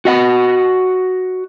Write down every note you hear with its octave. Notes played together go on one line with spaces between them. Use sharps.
F#4 D#5 F#5